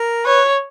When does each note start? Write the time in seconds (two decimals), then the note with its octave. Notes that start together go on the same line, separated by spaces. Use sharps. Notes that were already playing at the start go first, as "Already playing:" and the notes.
Already playing: A#4
0.25 B4 C#5